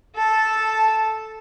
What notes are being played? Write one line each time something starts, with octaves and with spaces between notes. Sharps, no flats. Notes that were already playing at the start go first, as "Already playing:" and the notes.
A4 A5